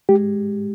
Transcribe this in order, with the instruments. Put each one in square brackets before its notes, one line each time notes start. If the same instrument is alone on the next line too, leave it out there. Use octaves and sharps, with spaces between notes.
[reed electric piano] G#3 G4